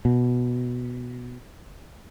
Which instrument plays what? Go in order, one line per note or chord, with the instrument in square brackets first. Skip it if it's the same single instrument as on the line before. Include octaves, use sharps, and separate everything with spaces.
[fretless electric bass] B2